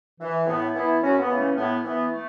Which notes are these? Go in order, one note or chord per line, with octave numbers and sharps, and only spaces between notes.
E3
A2 B3
E3 B3 E4
F#2 C#4 F#4
B3
C#3 E3
A3 C#4
A2 B3
E3 B3
A3